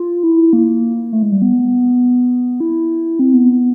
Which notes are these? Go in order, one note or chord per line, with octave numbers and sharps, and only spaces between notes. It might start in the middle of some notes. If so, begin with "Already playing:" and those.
Already playing: F4
E4
A#3
A3
G#3
G3
B3
E4
C4
B3